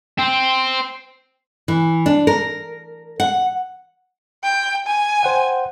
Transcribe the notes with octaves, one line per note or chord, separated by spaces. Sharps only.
C4
E3
D4
A#4
F#5
G5
G#5
C5 F#5 G5